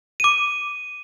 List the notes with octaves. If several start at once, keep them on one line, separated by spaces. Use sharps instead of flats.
D6 D#7